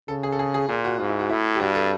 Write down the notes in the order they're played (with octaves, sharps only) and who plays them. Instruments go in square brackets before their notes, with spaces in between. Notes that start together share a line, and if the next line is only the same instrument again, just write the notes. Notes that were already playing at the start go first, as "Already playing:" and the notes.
[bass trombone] C#3 [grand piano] A4
[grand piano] G#4
A4
G#4
G#4
[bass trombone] A#2 [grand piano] G#4
[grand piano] F#4
[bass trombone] G#2 [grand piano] F4
[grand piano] E4
F#4
[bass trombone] A2 [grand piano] E4
[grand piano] G4
[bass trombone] G2 [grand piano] F#4
[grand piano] A4